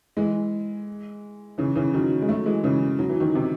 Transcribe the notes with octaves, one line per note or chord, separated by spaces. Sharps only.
E3 G#3
C#3 E3
C#3 E3
D#3 F#3
G#3
F#3 A3
E3 G#3
C#3 E3
F#3
E3
D#3 F#3
C3 D#3